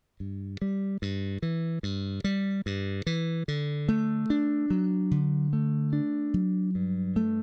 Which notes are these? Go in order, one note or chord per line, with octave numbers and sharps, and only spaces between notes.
G2
G3
G2
E3
G2
G3
G2
E3
D3
A3
D4
F#3
D3
A3
D4
F#3
G2
A3